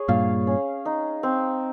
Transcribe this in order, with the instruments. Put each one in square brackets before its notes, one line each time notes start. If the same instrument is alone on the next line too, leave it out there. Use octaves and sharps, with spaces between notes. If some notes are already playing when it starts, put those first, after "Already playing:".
Already playing: [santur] G#4 C#5
[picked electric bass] G2 A#2 [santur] F5
[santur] C#4
D#4
C4